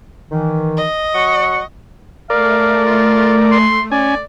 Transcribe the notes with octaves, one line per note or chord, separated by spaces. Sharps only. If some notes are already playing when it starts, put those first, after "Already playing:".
D#3 E3
D#5
F#3 F#5 C#6
A3 A#4 D5 F5
F4
C6
C#4 D5 G#5